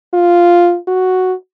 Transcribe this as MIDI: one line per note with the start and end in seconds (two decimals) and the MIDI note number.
0.14 0.77 65
0.87 1.33 66